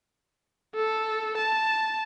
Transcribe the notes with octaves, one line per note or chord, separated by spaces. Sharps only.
A4
A5